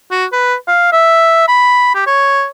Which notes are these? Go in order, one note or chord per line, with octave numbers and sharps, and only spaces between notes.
F#4
B4
F5
E5
B5
G4
C#5